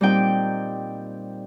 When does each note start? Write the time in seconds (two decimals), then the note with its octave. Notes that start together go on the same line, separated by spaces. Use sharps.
0.01 A#2 G3 C4 D#4 G5